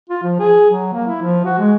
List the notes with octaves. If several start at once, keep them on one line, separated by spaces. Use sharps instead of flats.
F4
F3
G#4
F#3
A#3
E4
F3
F#4
G#3